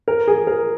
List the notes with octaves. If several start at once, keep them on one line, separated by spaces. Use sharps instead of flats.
A#4
G#4
A#4